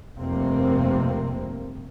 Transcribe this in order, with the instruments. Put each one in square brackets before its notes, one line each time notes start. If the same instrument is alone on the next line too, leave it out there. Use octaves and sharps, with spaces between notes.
[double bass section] F1 G2 C3 A#3 C4